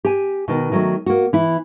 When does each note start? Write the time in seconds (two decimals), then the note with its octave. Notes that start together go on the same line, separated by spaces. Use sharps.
0.05 G4 G#5
0.48 B2 D#3
0.72 D#3 F#3 A3
1.06 A#3 F#4
1.33 E3 E4